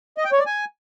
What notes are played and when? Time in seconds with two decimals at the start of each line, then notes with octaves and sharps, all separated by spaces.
0.18 D#5
0.25 G5
0.32 C#5
0.39 D5
0.46 G#5